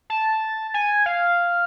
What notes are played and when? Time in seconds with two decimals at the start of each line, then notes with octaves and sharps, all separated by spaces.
0.10 A5
0.74 G#5
1.06 F5